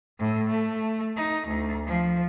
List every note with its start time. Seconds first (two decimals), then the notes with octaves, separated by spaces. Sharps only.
0.19 A2
0.50 A3
1.17 D#4
1.48 D2
1.87 F3